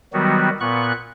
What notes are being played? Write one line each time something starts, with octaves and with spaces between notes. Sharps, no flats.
D#3 F#3 G3 B3 F#4
A#2 B3 C#6 F#6